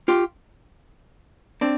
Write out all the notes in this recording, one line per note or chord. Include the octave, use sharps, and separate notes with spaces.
F4 G4
C4 D4